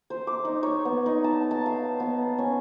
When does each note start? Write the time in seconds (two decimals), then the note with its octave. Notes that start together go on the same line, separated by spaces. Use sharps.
0.10 C5
0.27 D6
0.45 D#4
0.63 C#5
0.85 B3
1.06 D#4
1.24 A5
1.51 A5
1.66 F5
2.00 B3
2.38 C#4